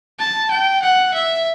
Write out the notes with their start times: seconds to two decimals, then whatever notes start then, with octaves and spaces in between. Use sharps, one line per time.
0.19 A5
0.51 G5
0.82 F#5
1.14 E5